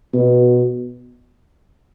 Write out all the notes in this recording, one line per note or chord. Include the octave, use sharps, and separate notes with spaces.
B2